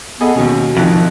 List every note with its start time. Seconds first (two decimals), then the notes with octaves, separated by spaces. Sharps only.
0.21 B3 G#4 A4 D#5
0.36 D#2 B2 C#4
0.77 C2 F2 D#3 F#6